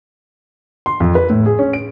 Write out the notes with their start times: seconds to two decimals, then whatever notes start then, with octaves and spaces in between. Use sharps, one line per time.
0.86 C6
1.00 F2
1.15 B4
1.30 A2
1.46 G#4
1.59 C#4
1.73 D7